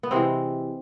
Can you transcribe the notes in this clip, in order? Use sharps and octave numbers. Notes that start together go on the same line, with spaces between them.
B3
C3 E3 G#3 C4